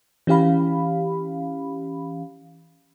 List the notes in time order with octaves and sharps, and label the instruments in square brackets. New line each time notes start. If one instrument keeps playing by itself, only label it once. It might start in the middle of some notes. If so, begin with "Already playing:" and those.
[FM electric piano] E3 C#4 G4 F5 B5